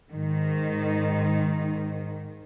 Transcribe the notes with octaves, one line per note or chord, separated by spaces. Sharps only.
G#2 D#3